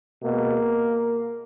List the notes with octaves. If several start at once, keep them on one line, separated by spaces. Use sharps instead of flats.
B2 G#3 A#3